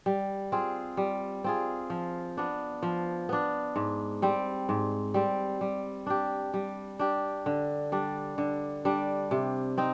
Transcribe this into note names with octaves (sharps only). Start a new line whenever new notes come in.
G3
C4 F4 G#4
G3
C4 F4 G#4
F3
B3 D4
F3
B3 D4
G#2
G3 C4
G#2
G3 C4
G3
D4 G4
G3
D4 G4
D3
G3 D4
D3
G3 D4
C3
C4 D#4